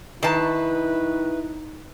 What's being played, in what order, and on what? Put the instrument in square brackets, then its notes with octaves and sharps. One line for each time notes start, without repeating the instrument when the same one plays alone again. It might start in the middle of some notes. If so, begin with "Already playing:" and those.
[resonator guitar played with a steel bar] D#3 A5 [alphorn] D#4 [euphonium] E4 [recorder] B4